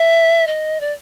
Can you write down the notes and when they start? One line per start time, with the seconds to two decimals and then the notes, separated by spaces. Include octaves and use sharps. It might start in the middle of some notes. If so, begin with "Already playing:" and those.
Already playing: E5
0.47 D#5
0.80 D5